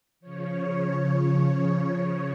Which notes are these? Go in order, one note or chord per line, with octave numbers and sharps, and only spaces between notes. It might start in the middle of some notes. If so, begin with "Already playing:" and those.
C#3 F3 C#5